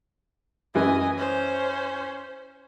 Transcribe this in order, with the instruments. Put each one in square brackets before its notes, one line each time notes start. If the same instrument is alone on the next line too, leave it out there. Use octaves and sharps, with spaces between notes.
[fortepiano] F#2 E3 [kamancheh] D#5 G#5
[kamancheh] C#4 C5